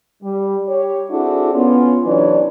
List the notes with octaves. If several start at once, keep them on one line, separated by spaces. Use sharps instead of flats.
G3
G4 C#5
C4 D4 E4 F#4 G#4 A4
B3 C#4 F4
C3 E3 F#3 D4 B4 C#5